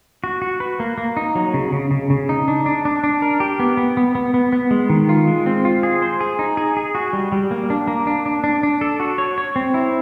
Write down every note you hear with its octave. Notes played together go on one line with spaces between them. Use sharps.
F#4
F#4
B4
A#3
A#3
D#4
F#3
C#3
C#3
C#3
C#3
D#4
D4
D4
D4
D4
A#4
G4
B3
B3
B3
B3
B3
B3
G#3
D#3
F4
G#3
C4
F4
G#4
C5
G#4
D#4
G#4
G#4
F#4
G3
G3
A#3
D4
A#3
D4
D4
D4
D4
A4
F#4
C#5
C#5
C4
E4